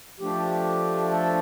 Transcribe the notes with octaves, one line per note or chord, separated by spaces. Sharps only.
F3 A3 D4 G4
A4